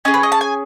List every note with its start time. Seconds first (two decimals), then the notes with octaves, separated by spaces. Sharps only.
0.05 C#4 G#4 D#5
0.14 B4
0.23 D#5
0.32 A5
0.41 G#5